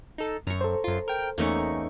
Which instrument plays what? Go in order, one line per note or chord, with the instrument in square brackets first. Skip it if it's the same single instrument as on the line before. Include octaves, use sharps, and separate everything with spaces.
[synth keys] D#4 A4
[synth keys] F#2 [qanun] A#5 C#6
[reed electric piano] A4 C5
[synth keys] F#2 F4
A#4 G5
[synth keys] E2 A3 C#6 [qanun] A#3 C#4 D#4